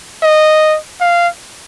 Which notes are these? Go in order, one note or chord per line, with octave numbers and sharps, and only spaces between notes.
D#5
F5